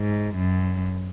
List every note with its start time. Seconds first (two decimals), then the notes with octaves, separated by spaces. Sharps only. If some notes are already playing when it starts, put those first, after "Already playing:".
Already playing: G#2
0.36 F#2